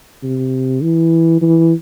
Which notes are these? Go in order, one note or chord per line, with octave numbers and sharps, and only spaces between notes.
C3
E3
E3